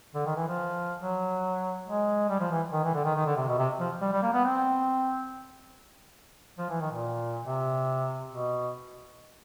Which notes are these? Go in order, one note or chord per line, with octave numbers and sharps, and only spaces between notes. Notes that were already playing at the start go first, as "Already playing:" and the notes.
D3
D#3
E3
F3
F#3
G#3
G3
F3
E3
D#3
E3
D3
D#3
D#3
D3
C3
B2
C3
F3
G3
G3
A#3
B3
C4
F3
E3
D#3
A#2
C3
B2